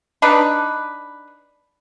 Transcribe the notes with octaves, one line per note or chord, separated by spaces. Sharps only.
D4 D#4 B4